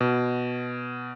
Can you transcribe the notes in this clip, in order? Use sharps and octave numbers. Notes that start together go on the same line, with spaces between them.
B2